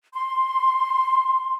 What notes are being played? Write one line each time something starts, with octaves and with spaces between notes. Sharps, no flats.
C6